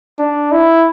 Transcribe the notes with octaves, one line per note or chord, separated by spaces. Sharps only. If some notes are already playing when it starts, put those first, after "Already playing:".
D4
E4